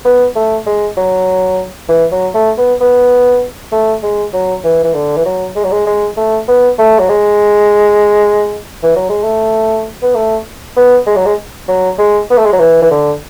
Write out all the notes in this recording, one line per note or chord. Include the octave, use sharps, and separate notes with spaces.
B3
A3
G#3
F#3
E3
F#3
A3
B3
B3
A3
G#3
F#3
E3
E3
D3
E3
F#3
G#3
F#3
G#3
G#3
A3
B3
A3
F#3
G#3
E3
F#3
G#3
A3
B3
A3
B3
G#3
F#3
G#3
F#3
G#3
B3
A3
G#3
F#3
E3
E3
D3